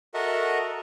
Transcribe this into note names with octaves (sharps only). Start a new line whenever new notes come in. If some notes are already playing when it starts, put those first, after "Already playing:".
F#4 A4 A#4 D#5 E5 F#5